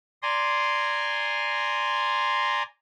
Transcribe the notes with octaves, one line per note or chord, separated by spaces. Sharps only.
D5 G#5 A#5 C6